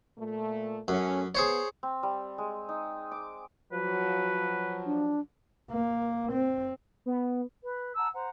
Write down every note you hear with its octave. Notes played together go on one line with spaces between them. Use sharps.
A#2 A3
F#2 A3 C#4
B3 G#4 C5 C#5
C4
G3
G#3
D#4
D6
F3 F#3 B4
D4
A#3
C4
B3
B4
F#5 A5 A#5 E6
C5 F#5 A#5